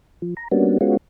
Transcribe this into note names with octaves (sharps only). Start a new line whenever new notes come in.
F3
A#5
G3 A#3 B3 C#4 D4 F#4
G#3 B3 C#4 F4 F#4